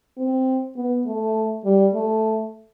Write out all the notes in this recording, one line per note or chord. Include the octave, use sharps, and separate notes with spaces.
C4
B3
A3
G3
A3